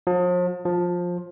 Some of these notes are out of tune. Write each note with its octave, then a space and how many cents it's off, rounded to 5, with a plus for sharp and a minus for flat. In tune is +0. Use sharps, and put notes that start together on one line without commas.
F3 +40
F3 +15